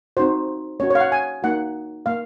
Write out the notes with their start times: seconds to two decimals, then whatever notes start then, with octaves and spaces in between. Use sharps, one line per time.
0.17 C4 D#4 F#4 C5
0.80 A#3 C#4 F#4 C#5
0.90 C#5
0.95 F5
1.00 F#5
1.12 G#5
1.43 A#3 D#4 F#4 F#5
2.06 A#3 F5